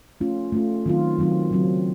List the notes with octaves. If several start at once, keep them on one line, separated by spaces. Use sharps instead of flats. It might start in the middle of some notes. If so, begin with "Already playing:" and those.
A3 C#4 F4
A3 C#4 F4
D#3 F#3 C4 F4
D#3 F#3 C4 F4
C#3 F#3 C4